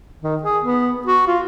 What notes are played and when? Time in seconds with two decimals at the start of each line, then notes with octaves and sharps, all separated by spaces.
0.23 D#3
0.44 G#4
0.64 B3
1.06 F#4
1.27 F4